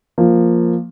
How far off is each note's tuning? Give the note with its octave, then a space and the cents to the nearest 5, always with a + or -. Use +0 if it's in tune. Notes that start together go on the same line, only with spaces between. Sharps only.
F3 +0 A#3 +0